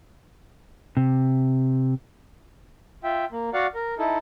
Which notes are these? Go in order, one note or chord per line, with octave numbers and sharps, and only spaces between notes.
C3
F4 E5 G5
A#3
F#4 D5 F5 F#5
A#4
D#4 E4 A4